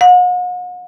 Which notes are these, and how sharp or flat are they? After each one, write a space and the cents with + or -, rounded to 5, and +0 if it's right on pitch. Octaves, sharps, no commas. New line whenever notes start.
F#5 -40